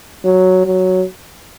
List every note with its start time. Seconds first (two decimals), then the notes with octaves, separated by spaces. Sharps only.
0.24 F#3
0.66 F#3